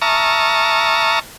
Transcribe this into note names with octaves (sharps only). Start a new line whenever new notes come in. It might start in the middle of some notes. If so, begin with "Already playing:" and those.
E5 A5 A#5 C#6 D#6 F6